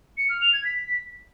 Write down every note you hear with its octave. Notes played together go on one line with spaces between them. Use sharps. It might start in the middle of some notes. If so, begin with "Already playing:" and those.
C#7
F6
F7
G#6
B6